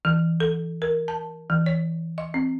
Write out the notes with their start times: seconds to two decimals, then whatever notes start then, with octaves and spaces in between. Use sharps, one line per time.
0.05 E3
0.40 A4
0.82 A#4
1.08 A5
1.50 E3
1.66 C#5
2.18 D#5
2.34 C4